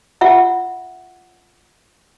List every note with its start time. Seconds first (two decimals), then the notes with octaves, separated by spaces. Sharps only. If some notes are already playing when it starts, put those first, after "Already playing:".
0.21 F4 E5 F#5